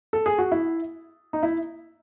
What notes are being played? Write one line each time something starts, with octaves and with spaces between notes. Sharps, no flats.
A4
G#4
F#4
E4
D#4
E4